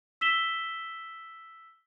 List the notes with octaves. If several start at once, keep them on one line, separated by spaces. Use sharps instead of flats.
E6 B6 E7 G7